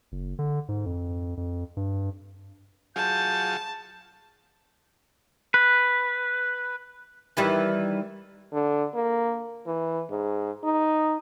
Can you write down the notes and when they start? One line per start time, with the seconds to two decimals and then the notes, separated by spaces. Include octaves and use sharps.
0.12 F#1
0.39 D3
0.68 G#2
0.86 F2
1.37 F2
1.77 G2
2.96 F#3 F4 G#4 A5 G6
5.54 B4
7.37 D#3 E3 G3
8.53 D3
8.94 A#3
9.66 E3
10.10 G#2
10.64 D#4